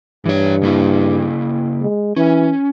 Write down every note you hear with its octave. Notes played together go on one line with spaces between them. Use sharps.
G2 E3 C#5
C#3 A#3 E4
G#3
E3 C#4